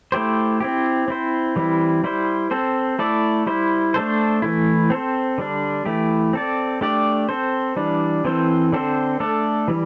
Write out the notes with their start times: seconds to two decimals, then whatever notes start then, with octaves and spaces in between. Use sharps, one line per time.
0.12 A3 E4 G4 C5
0.60 C4 E4 G4
1.08 C4 E4 C5
1.56 E3 G3 C4 E4
2.04 G3 E4 C5
2.51 C4 A4 C5
2.99 A3 E4 A4 D5
3.47 G3 E4 C5
3.94 A3 D4 A4 C5
4.42 E3 A3 E4
4.90 C4 A4 C5
5.38 D3 G3 D4
5.85 E3 A3 E4 G4
6.33 C4 A4 D5
6.81 A3 D4 G4 D5
7.29 C4 A4 C5
7.77 E3 G3 D4
8.25 E3 C4 A4 C5
8.72 D3 C4 A4 C5
9.20 A3 D4 A4 D5
9.68 E3 G3